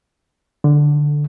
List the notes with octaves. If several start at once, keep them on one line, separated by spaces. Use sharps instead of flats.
D3